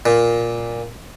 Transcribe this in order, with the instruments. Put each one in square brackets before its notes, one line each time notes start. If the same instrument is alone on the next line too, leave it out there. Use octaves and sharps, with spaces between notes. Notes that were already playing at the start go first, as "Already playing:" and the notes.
[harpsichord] A#2